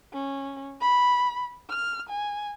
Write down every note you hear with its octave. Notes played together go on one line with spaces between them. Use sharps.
C#4
B5
F6
G#5